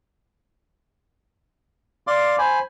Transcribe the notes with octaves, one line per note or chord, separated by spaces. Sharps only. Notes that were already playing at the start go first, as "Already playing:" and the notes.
D5 F5 C6 D6
C5 G#5 B5